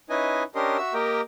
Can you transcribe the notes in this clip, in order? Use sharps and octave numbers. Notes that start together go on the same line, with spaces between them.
C#4 D#4 E4 B4 D#5 G#5
C#4 D4 G4 A#4 D#5 C6
F#4 E5 E6
A#3 G4 A#4 D#5 G5